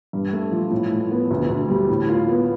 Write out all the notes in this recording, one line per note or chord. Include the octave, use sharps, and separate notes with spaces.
G2
A3
F3
A2
A2
B3
D2
D2
G3
A2
F4
B3